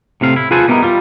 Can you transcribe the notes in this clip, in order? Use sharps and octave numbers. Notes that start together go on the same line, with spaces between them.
A2 C3 C4 F5
E4
F4 G#4 B4 C5 G#5 A5
G3 B3 E4 A#4 D#5
G3 F4